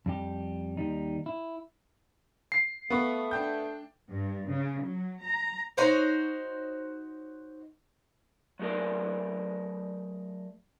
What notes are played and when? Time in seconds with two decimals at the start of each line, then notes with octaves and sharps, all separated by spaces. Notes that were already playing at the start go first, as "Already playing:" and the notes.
0.06 F2 G3 G4
0.77 D#2 G3 D#4
1.26 E4
2.52 C7
2.90 A3 B3 F5 B5 C#6
3.31 D4 G5 G6
4.10 G2
4.48 C#3
4.81 F#3
5.23 A#5
5.77 D#4 F#4 C5 C#5
8.59 F#3 A3 G#4 A#4 D5